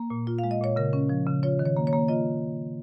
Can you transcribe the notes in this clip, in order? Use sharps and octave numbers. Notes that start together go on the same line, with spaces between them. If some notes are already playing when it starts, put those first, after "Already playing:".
Already playing: A#3
A#2
F4
F5
G#3
D#5
A#2 C#5
C#3 A#4
C#4
F3
C#3
F4 C#5
D#3
C#5
A#3
C#5
A#3
F4 D#5